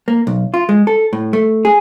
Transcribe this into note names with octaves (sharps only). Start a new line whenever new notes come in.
A#3
B1
F4
G#3
A4
A2
A3
G#4